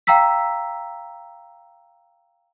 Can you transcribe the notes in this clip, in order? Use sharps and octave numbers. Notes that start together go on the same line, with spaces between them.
F5 G5 A#5 E6 B6